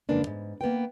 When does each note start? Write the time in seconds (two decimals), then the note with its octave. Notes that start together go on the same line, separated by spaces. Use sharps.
0.09 F2 C#3 G#3 A#3 D4 B4
0.22 D#2 G#2
0.61 A#3 B3 B4 G5